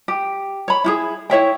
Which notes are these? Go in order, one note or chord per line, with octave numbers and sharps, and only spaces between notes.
G4
C#5 B5
E4 F#4 G#4
E4 C#5 E5 G5